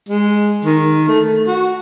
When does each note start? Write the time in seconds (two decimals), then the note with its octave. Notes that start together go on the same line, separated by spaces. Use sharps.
0.09 G#3
0.65 D#3
1.08 A3
1.47 F#4